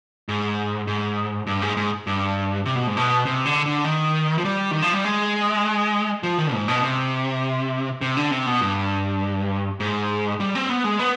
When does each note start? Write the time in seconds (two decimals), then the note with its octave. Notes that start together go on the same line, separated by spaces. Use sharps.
0.29 G#2
0.87 G#2
1.47 G2
1.62 G#2
1.77 G#2
2.07 G2
2.66 C3
2.76 B2
2.87 G#2
2.97 B2
3.25 C3
3.46 D3
3.66 D3
3.85 D#3
4.38 F3
4.45 G3
4.71 D#3
4.82 F3
4.93 G3
5.05 G#3
6.23 F3
6.38 D#3
6.53 G#2
6.68 B2
6.82 C3
8.01 C3
8.17 D3
8.31 C3
8.46 B2
8.61 G2
9.80 G#2
10.40 G3
10.55 C4
10.69 B3
10.84 G#3
10.99 B3